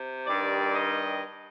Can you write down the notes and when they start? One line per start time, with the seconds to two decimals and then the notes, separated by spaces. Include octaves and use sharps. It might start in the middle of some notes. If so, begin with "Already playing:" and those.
Already playing: C3
0.26 G2 D#3 G3 D5
0.74 D#5